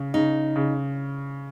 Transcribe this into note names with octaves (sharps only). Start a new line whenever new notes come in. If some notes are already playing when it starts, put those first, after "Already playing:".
Already playing: C#3
C#3 D#4
C#3